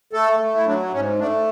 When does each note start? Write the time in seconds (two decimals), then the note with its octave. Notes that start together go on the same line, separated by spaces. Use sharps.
0.13 A3 A4
0.40 A3
0.54 E4
0.65 F#3 D4
0.93 G#2 C#4
1.19 A3 D4